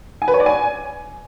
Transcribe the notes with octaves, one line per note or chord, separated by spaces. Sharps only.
G#5
B4
C#5
D5
G#5